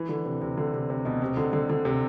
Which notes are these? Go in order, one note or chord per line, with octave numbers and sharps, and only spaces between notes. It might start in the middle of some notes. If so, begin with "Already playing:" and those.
Already playing: E3
D3
C3
C3
D3
C3
C3
B2
C3
D3
D3
D3
C3